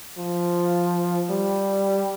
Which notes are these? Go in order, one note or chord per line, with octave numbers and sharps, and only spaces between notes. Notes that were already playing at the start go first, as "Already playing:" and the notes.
F3
G3